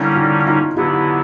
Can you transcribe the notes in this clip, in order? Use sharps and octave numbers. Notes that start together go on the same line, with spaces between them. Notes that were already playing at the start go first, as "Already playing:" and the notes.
Already playing: D3 G3 A#3 C#4 D4 E4
D#4 F4
D#4 F4
D3 F#3 B3 E4 F4 G4